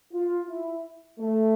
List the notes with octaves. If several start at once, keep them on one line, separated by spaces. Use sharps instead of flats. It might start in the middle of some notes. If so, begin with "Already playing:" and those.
F4
E4
A3